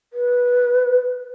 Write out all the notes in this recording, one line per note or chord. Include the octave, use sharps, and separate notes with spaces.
B4